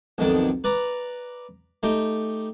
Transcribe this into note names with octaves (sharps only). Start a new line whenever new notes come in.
B1 F2 D#3 D4 A4
B4 D5 A#5
A3 D#4 G4